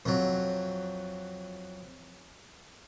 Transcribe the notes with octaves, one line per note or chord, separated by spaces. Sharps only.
F2 F#3